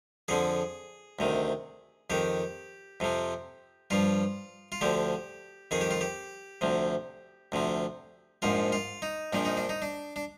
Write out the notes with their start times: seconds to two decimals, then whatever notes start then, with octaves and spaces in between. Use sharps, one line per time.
0.28 F2 D3 F3 G#4
1.19 D2 C3 D#3
2.10 F2 D#3 G4
3.00 F2 C3 F3
3.90 G2 F3 F4
4.72 F4
4.81 D2 D3 F3 G4
5.71 F2 D#3 G#4
5.81 G4
5.91 F4
6.01 G4
6.61 D2 C3 F3
7.52 D2 C3 F3
8.42 A#1 G#2 F3 F4
8.72 F4
9.02 D#4
9.33 A#1 A#2 F3 D4
9.45 D#4
9.57 D4
9.69 D#4
9.82 D4
10.16 D4